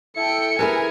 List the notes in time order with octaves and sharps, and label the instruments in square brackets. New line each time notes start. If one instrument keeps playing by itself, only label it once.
[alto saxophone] E4 [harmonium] A4 [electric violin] G5 C#7
[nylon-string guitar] E4 G#4 B4 [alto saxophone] A#4 [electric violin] G#5